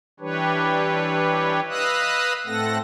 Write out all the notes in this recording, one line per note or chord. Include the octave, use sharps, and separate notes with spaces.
E3 G3 D4 G4 B4 C#5
B4 D#5 F5 D#6 E6 F#6
A2 A3 C4 A4 F#5 A#6